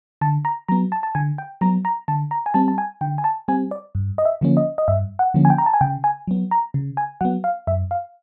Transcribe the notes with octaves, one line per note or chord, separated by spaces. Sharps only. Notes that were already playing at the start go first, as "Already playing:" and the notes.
D3 A5
A#5
F#3 B3 A#5
A5
A5
D3 G#5
G5
F#3 B3 A#5
A#5
D3 A5
A#5
G#5
G3 C4 A5
A5
G#5
D3 G5
G#5
A5
G3 C4 G#5
D5
G2
D#5
E5
D3 F3 A#3 C#4
D#5
D#5
G2 E5
F#5
D3 F3 A#3 C#4
G#5
G5
A#5
A5
G#5
C#3 G5
G#5
F#3 B3
A#5
C#3
G#5
F#3 B3 F#5
F5
F#2 E5
F5